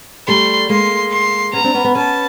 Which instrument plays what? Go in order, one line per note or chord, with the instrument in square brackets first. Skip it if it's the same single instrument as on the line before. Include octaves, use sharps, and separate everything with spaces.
[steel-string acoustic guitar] G3 A3 [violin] C6
[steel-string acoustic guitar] G#3 A#3 [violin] C6
[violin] C6
[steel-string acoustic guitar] B3 C#4 [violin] A#5
[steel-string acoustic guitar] C4 D4
B3 C#4
B3 C#4
[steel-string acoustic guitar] B3 C#4 [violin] A5